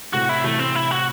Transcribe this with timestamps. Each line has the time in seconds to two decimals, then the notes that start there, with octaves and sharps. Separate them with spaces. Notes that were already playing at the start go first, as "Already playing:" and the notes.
0.13 A2 C3 F#4
0.29 E4
0.44 C3 E3 A3
0.59 C4
0.75 E4
0.91 F#4